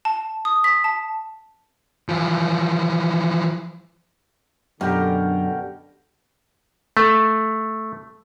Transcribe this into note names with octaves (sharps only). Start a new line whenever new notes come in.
A5
D#6
B6
A5
E3 F3
F#2 B2 D3 G4 A#4
A3